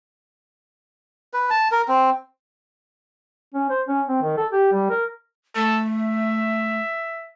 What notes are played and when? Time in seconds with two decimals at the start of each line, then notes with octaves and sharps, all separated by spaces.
1.34 B4
1.50 A5
1.72 A#4
1.88 C4
3.54 C#4
3.69 C5
3.88 C#4
4.08 C4
4.22 D#3
4.37 A4
4.52 G4
4.72 G3
4.90 A#4
5.55 A3 A4
5.89 E5